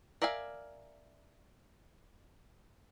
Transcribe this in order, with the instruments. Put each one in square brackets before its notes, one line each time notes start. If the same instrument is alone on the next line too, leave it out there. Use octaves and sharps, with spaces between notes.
[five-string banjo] A#4 D5 E5 F5 G#5